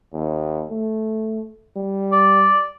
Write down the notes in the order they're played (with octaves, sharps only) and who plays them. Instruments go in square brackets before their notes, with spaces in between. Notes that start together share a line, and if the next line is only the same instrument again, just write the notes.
[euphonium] D#2
A3
G3
[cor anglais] D5